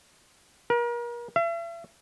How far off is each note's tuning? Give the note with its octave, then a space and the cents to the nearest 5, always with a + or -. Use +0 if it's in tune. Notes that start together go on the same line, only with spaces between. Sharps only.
A#4 +35
E5 +40